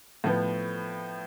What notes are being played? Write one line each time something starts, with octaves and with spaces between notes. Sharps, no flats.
A2 F3 B3